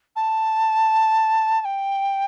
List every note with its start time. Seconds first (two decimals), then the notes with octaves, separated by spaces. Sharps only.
0.16 A5
1.61 A5
1.65 G5